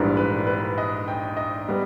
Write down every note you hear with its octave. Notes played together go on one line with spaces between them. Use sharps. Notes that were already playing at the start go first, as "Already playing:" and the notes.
Already playing: A#1 G#2 E3 G3 A#4
B4
B4
D#5
G5
D#5
G3 B3